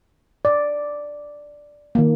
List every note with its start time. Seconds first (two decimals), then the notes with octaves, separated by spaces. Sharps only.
0.45 D5
1.95 D#3 A#3